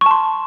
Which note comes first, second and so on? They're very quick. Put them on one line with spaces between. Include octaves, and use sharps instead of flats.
C#6 A5 C6